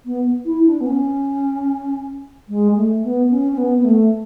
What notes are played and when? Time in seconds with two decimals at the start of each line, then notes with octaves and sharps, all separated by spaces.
0.05 B3
0.45 E4
0.66 D4
0.80 B3
0.86 C#4
2.48 G#3
2.76 A3
3.03 B3
3.30 C#4
3.52 C#4
3.57 B3
3.78 B3
3.84 A3